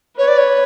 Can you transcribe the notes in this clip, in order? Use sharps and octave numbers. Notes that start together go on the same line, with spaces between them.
B4 C#5
D5
C#5